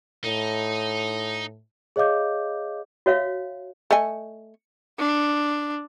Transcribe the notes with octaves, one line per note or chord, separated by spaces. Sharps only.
A2 D#4
G#4 C#5 D#5 F5 D6 G6
F#4 C#5 E5 F5
A3 D#5 G#5
D4